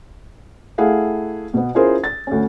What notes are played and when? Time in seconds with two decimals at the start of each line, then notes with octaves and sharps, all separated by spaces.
0.78 A3 E4 G#4 F5 F#5
1.54 B2 B3
1.75 C#4 E4 F4 G#4 A#4 C5
2.04 A6
2.27 D2 C#4